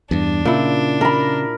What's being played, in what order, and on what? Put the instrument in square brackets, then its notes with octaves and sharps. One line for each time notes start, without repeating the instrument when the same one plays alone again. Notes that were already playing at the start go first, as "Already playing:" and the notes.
[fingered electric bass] E2 G2 [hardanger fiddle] D4
[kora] A#2 E4 [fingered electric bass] C#3
[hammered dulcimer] A#4 B5